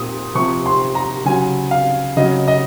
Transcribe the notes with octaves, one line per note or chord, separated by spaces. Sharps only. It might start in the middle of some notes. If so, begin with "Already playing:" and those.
Already playing: A#2 D#6
C3 F3 C#6
C6
A#5
C#3 F#3 G#5
F5
C#3 F#3 D#5
D#5